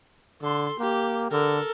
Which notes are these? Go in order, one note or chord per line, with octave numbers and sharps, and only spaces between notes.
D3 A4 C6
A#3 G4
D3 A4 A#4